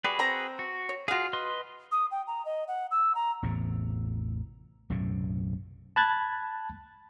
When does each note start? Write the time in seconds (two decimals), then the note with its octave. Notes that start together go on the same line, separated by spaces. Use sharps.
0.04 G3 F#4 G#4 B4
0.19 C4 A#5
0.59 F#4
0.89 C#5
1.08 F4 F#4 G#4 F5
1.33 B4 D#5 C6
1.92 D#6
2.11 G5
2.27 A#5
2.45 D#5
2.68 F#5
2.91 E6
3.15 A#5
3.43 A1 E2 A2 C3
4.90 B1 F#2 A2 C3
5.96 A5 B5 F#6 G#6 A6